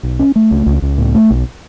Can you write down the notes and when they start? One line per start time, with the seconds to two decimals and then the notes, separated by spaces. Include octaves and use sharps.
0.03 B1
0.19 C#4
0.36 A3
0.51 C#2
0.66 C#2
0.82 C#2
0.98 A2
1.14 A3
1.31 B1